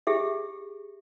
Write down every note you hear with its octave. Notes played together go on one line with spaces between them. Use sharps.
G4 G#4 E5